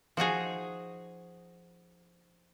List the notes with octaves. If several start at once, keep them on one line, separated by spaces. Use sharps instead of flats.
F3 D#4 F#4 G#4